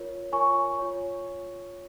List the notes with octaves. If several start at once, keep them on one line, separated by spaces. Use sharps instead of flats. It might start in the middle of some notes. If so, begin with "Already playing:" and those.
Already playing: F4 A#4 C#5
F4 A#4 C#5 G#5 C#6
F4 C#5